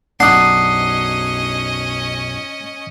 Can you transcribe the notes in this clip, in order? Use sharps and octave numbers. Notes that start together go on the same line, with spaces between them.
B1 F#2 C#4 D4 D#5 F#5 D#6 C7